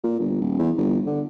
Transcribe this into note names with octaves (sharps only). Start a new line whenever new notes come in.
A#2
G1
D#1
E2
G1
D3